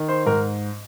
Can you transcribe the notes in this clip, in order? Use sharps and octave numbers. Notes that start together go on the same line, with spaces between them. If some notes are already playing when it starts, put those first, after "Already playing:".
Already playing: D#3
C5
G#2 A#4